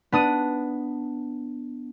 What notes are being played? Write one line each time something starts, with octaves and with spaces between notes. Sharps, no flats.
B3 D4 D#6 D#7